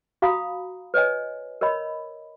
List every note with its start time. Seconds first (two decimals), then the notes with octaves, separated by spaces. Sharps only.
0.22 F#4 F5 A#5 B5 D#6
0.94 B4 C#5 D#5 G#5
1.61 A#4 C#5 D#5 B5